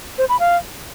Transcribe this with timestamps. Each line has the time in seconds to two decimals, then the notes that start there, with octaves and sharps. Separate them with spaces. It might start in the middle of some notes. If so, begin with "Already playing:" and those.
0.18 C5
0.29 B5
0.40 F5